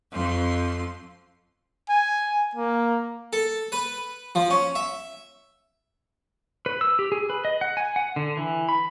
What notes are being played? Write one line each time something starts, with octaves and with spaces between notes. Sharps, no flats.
F2 C6
G#5
A#3
A4
B4
F3
C#4
E5
B4
E6
G4
G#4
B4
D#5
F#5
G#5
F#5
D3
E3
B5